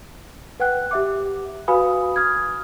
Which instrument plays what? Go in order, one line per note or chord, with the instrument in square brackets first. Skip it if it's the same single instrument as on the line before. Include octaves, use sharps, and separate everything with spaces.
[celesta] B4 F#5 G5 F#6
G4 E5 D6
F#4 B4 F5 G#5 B5 D#6
D#6 F6 G#6